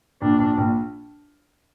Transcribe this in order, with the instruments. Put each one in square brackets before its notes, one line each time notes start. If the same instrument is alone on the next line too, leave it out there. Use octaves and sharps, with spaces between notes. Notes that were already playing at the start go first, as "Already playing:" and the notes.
[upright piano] A#1 [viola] D4
[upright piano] A#1
A#1